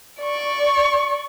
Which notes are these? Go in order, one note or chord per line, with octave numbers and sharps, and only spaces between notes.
D5 C#6